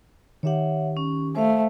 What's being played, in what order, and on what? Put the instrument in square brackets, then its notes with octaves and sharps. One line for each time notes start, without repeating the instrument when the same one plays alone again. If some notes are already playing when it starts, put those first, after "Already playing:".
[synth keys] D#3 G4 [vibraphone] C#5 E5 F#5
[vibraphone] C#4
[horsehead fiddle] A3 [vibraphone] C5 F5